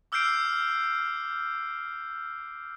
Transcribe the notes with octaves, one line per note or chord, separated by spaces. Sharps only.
D6 E6 F6 G6 C7 D7